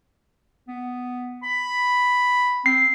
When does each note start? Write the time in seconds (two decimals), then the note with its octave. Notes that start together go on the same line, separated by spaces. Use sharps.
0.68 B3
1.43 B5
2.66 C4 C7